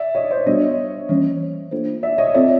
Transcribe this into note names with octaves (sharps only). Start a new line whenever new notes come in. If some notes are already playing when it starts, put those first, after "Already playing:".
Already playing: D5 E5
C#5 D#5
C5 D5
G3 B3 D4 F#4 C#5 D#5
E3 G3 A#3 C#4
A#3 D4 F4 A4 C5
D5 E5
C#5 D#5
C4 F4 A4 C#5 D5 E5